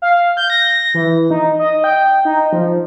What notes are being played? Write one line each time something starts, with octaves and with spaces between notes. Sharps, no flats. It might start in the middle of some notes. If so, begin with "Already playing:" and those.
F5
G6
A#6
E3
D#4
D#5
G5
D#4
F3